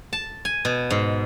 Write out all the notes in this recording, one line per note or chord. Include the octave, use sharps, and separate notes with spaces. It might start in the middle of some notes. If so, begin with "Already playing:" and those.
A5
G#5
B2
G#2